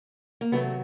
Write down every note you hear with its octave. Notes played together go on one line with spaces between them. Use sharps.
A#3
C3 D#3 F#3 A3 B3